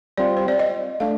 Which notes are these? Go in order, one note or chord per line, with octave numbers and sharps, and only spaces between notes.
G3 C4 F4 D5
C5
D5
D#5
A3 D4 F5